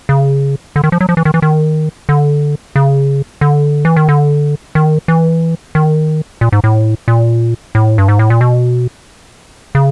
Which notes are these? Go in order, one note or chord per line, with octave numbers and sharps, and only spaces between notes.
C#3
D3
D#3
F3
F#3
F3
E3
D#3
E3
D#3
D3
C#3
D3
E3
D#3
D3
D#3
E3
D#3
A#2
G#2
A2
A#2
A2
G2
G#2
A2
A#2
B2
C#3